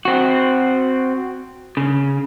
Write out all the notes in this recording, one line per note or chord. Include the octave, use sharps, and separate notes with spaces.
C4 F#4
C#3